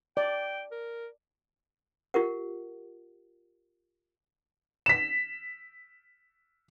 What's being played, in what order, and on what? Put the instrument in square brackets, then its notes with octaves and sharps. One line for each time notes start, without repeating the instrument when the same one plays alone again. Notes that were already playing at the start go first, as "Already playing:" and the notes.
[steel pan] D5 [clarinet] G5
[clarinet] A#4
[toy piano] F4 G4 A#4 F#5
[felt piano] B6 E7